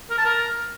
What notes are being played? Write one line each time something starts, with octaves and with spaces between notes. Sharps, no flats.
A#4
A5
A#4